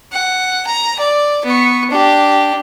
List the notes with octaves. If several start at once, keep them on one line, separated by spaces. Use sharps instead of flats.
F#5
A#5
D5
B3 C#6
D4 G4